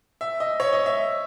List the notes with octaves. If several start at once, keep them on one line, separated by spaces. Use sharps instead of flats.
E5
D#5
C#5
D#5
E5